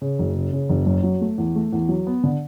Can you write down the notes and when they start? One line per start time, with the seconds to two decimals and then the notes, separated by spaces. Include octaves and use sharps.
0.01 C#3
0.19 F#1
0.35 C#3
0.53 C#3
0.69 F#1
0.86 F#2
1.03 F#3
1.21 A3
1.38 E2
1.56 A3
1.72 E2
1.89 F#3
2.07 B3
2.24 D3